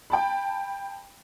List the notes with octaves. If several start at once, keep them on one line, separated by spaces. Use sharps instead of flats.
G5 A5 B5